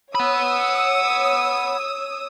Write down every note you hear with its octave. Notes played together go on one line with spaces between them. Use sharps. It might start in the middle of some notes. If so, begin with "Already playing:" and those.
C#5 F#5 B5 D#6 E6